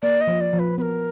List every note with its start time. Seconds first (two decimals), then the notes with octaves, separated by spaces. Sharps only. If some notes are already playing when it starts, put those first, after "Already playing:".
0.02 A#3 D5
0.21 D#5
0.27 F3
0.41 D5
0.53 F3
0.59 B4
0.78 B3 B4
0.82 A#4